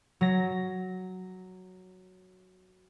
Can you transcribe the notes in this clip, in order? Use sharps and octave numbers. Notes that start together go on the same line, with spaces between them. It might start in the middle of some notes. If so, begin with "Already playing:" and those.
F#3 A#6